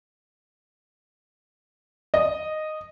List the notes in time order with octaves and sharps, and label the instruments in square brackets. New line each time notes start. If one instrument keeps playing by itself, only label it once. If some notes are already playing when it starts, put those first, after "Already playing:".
[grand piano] D#5